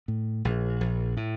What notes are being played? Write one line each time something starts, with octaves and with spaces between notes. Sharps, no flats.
A2
A#1
A#1
A2